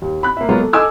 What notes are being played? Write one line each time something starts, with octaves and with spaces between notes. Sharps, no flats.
D#2
B5 F#6
A#3 E5
F#3 G#3 A#3 B3 F4
A4
A4 D#5 G#5 D6 E6 G#6